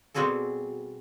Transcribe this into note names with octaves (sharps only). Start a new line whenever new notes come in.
B2 G3 C4 F#4 G#4 A4